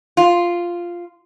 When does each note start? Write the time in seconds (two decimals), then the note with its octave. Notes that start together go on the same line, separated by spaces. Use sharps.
0.17 F4